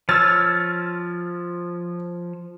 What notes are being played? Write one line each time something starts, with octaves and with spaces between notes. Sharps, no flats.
F3 C#5 E6 F6 A6